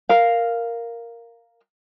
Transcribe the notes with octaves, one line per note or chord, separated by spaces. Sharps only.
A#4 F5